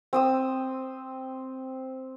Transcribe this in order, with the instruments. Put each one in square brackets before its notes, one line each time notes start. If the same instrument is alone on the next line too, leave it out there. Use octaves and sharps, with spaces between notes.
[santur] C4 D#6 E6